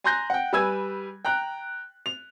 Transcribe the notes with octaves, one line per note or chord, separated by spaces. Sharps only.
G#5 A#5 C6 F#6 G6 A#6
F#5 G5
G3 B4 G#5 E6 G#6
G5 A#5 F#6
F7